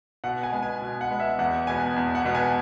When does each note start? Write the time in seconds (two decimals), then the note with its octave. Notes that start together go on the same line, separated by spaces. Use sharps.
0.24 B2 F#5
0.43 G#5
0.52 G#3 B3
0.63 G#5
0.82 B2
1.01 F#5
1.10 G#3 B3
1.20 E5
1.39 E2 F#5
1.67 B2 G#3 B3 G#5
1.96 E2
2.15 F#5
2.25 B2 G#3 B3
2.35 G#5